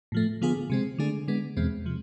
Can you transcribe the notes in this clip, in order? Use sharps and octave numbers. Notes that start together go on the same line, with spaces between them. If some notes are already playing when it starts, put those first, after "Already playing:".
A2 F3 A3
D3 F3 B3 F4 G#4
C3 G#3 C4
D3 A3 D4 G#4
D3 G#3 B3
E2 B2 G#3 C4
C3 F3